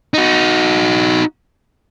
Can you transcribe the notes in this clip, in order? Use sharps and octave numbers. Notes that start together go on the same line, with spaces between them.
D#4 F#4